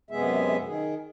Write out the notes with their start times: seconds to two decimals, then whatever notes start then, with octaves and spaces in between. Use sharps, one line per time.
0.11 F#2 C3 G#3 B3 G#4 E5
0.65 D#3 G#4